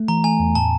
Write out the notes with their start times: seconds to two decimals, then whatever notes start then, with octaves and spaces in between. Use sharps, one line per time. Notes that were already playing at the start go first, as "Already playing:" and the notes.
Already playing: A3
0.08 E3 A#5
0.24 A3 G#5
0.40 E2
0.55 A2 A5